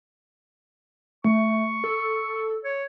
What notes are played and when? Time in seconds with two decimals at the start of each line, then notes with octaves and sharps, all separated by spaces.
1.24 A3 C#6
1.84 A4
2.65 C#5